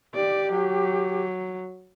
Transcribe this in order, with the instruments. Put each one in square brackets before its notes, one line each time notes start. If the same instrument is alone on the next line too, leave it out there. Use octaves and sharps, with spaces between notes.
[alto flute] G4 [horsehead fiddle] D5
[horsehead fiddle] F#3